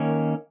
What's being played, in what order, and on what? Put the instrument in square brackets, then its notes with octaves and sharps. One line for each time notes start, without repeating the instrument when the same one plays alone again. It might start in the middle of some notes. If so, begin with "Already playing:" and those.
Already playing: [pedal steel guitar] D#3 A#3 C#4